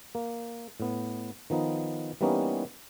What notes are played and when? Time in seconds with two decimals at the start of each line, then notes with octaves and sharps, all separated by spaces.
0.15 A#3
0.80 A2 B3
1.50 D#3 F3 B3 D#4
2.21 E3 G3 A#3 B3 C#4 D#4